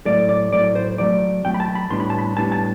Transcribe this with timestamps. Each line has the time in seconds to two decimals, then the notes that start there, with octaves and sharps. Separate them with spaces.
0.06 A2 F#3 A3 D5
0.29 D5
0.52 A2 F#3 A3 D5
0.75 C5
0.98 A2 F#3 A3 D5
1.45 A2 F#3 A3 G5
1.54 B5
1.60 A5
1.75 B5
1.90 A2 G3 B3 D4 C6
2.00 B5
2.10 A5
2.18 B5
2.37 A2 G3 B3 D4 A5
2.52 A5